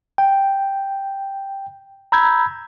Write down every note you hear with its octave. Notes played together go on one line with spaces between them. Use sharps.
G5
A#5 B5 E6 G6 G#6